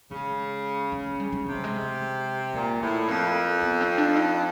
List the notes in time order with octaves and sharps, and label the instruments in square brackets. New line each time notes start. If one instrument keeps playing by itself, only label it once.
[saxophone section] C#3 [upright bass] G#3
[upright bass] G#3
G#3
G3
G3
[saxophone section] C3 [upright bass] G3
[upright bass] G#3
G#3
[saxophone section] A#2 [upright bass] G#3
[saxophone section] A2 [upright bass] A3
[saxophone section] F2 [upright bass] A#3
[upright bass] B3
C4
D4
D#4